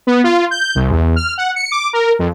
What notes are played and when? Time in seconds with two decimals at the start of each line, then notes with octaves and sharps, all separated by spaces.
0.07 B3
0.24 F4
0.51 G6
0.75 C2
0.90 E2
1.16 F6
1.38 F#5
1.56 C#7
1.72 D6
1.93 A#4
2.19 F2